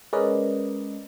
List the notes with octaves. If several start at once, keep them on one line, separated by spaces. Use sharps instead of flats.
G#3 C#4 A#4 B4 D5 D#5